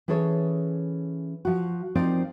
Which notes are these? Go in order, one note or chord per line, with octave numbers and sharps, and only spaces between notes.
E3 C#4 G#4 A4 C#5
F3 F#4
F3 C4 D#4 A#4 D5